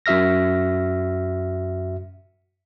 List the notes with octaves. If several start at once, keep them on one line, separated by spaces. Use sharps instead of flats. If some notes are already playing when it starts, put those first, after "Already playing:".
F#2 F#4 E5 F6 A#6